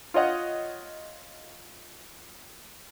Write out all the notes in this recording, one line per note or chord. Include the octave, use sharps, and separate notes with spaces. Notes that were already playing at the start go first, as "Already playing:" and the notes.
F4 C#5 D#5 F#5